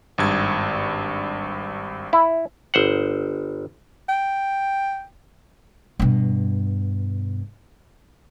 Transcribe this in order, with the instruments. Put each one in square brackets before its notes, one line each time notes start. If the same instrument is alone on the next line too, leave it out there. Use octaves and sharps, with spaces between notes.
[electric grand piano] G#1 G2 G#6
[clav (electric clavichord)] E4
G1 C5 F#5
[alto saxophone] G5
[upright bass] G2 B2